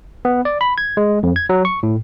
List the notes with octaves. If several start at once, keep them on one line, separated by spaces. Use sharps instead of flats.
B3
D5
B5
G#6
G#3
F2
G#6
F#3
C#6
A2